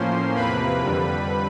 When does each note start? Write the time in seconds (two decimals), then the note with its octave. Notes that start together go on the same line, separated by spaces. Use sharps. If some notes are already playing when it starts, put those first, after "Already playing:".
Already playing: A2 F3 A#3 C#4 C5 C6
0.35 E2 C3 F3 A#3 B4 B5
0.83 F2 D3 G3